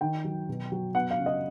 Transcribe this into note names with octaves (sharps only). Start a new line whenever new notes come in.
D#3 G5
F#3
B2
F#3
B3 F#5
F5
C#3
D#5